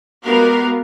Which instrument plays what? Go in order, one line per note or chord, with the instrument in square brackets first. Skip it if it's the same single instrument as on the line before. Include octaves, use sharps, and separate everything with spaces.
[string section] G#3 B3 F#4 G4 A#4 F5